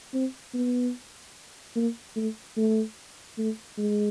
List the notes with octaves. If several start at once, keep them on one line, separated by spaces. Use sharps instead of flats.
C4
B3
A#3
A3
A3
A3
G#3